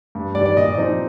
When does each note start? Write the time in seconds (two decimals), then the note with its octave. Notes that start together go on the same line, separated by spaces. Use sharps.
0.15 G2
0.35 D#3 G3 D5
0.46 D5
0.56 A#2 D#5
0.65 D5
0.75 F3 C4 D#4 D#5